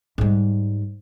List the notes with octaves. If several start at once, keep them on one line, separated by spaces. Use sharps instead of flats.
G#2 G3